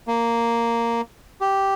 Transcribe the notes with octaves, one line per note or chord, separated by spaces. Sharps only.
A#3
G4